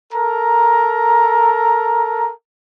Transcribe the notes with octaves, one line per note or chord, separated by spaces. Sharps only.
A4 A#4 A#5